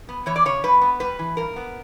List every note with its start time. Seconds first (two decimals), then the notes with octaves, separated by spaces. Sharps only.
0.09 B3
0.26 E3 C#5
0.36 D5
0.45 C#3 C#5
0.64 G2 B4
0.81 B3
1.00 G3 B4
1.19 E3
1.37 G2 A#4
1.56 B3